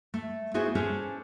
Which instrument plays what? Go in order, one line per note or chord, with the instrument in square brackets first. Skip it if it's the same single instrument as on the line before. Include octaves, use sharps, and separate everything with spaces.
[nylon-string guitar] A3
B3 E4 F#4 G#4 C5
C#4 D4 G#4 A4 C5